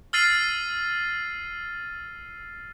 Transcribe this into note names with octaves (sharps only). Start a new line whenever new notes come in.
E6 F6 A6 C7 D#7